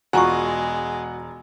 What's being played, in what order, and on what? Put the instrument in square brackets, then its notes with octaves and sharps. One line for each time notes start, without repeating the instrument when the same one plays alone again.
[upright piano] E1 F4 [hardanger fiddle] G#3 [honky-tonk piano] F#4 [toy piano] G#5 A#5 C#6